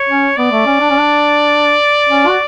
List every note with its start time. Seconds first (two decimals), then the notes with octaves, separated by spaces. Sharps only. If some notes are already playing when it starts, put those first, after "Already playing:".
Already playing: C#5
0.09 C#4
0.37 B3 D5
0.52 A3
0.66 C#4
0.80 D4
0.90 C#4
0.99 D4
2.09 C#4
2.28 F#4